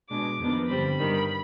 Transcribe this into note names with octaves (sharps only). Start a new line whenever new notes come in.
B2 G#3 D4 D6
F2 D#3 B3 D4
G2 D3 G3 C4 B5
G2 D#3 G3